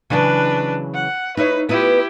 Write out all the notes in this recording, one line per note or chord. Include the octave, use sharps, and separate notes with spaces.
C#3 E3 F#3 D4 B4
F#5
D#4 E4 B4 C#5
B3 E4 F4 G4 B4